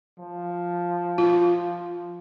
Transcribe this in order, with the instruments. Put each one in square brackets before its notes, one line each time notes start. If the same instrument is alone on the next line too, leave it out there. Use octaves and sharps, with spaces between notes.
[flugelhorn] F3
[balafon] F4